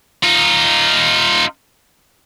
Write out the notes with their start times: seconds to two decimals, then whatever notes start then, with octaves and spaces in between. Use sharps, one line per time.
0.23 D#4 F4